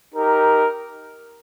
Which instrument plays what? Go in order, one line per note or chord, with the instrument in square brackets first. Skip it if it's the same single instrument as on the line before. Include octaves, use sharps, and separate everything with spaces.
[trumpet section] D#4 G4 A#4